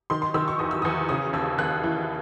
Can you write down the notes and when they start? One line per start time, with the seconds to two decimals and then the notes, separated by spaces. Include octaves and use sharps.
0.10 D#3 C6
0.22 C6
0.34 D#3 E6
0.48 C#6
0.59 E2 D#6
0.71 E6
0.82 E2 D#6
1.09 C#3 D#6
1.33 D#2 E6
1.58 D#2 F#6
1.83 E3